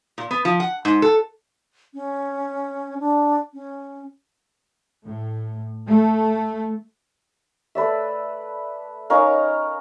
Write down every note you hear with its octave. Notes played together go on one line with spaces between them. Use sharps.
A#2
B3
F3
F#5
G#2
A4
C#4
D4
C#4
A2
A3
A3 B4 D5 E5
C#4 D#4 A#4 F5